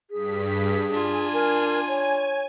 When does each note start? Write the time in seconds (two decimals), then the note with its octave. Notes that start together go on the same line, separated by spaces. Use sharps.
0.11 G2 G#4 B6
0.91 D4 F4 G#5
1.33 A#4
1.88 C#5